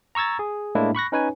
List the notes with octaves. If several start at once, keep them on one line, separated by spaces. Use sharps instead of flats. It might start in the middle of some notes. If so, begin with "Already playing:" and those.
A#5 C#6 E6 G#6 A6
G#4
A2 G#3 A#3 D4 E4
B5 C#6 F#6 A#6
C#4 D#4 B4 C#5 G#5